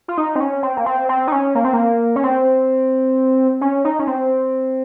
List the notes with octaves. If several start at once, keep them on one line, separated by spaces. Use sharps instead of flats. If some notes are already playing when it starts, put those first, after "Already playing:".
F4
D#4
C4
C#4
C4
A#3
C4
C4
D#4
C#4
A#3
C4
A#3
C#4
C4
C#4
D#4
C#4
C4